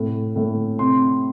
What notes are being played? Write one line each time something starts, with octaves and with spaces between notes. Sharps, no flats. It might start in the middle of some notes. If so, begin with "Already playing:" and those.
Already playing: A2 C3
A2
C3 C6